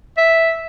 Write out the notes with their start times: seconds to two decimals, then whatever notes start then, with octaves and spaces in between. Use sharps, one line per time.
0.17 E5